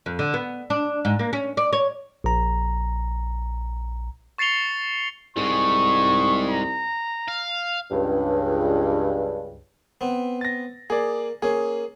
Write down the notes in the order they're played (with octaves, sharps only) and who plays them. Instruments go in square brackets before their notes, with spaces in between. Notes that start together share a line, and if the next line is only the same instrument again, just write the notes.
[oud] F2
D3
B3
D4
G#2
A#3
C#4
D5
C#5
[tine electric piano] A#1 A#5
[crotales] C#6 A6 C7 C#7 F7 G7
[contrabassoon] C2 [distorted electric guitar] G#2 G#3 [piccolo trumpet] C#6
[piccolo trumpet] A#5
[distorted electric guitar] F5
[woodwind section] C#2 G2
[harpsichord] B3 C4
[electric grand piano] A6 A#6
[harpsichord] A#3 [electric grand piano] G#4 D5
[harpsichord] A#3 C#4 [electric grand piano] G#4